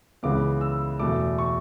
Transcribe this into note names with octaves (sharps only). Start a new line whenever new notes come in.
C#2 C#3 E3 B3 D6
E6
E2 B2 A3 D6
C#6